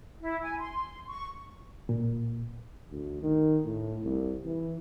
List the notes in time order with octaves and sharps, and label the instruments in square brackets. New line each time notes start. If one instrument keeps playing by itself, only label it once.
[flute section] E4
G#5
C6
C#6
[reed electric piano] A#2
[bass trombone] D2
D#3
A2
C2
E3